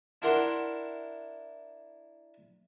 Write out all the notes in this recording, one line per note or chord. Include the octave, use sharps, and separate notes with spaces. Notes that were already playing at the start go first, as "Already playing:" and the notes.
D4 E4 A#4 F#5 C6